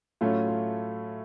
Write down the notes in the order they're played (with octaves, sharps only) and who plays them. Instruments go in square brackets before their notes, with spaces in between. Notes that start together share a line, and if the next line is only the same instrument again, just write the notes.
[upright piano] A2 F#3 A3 C#4 F4
F4